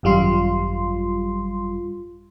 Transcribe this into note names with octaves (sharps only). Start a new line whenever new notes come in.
G#1 F#2 G3 F4 C6